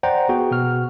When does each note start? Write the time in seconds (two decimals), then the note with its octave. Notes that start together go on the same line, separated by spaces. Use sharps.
0.03 C5 D5 F#5 G5 A#5
0.29 B3 F#4 G#4 G5
0.51 B2 F#4 F6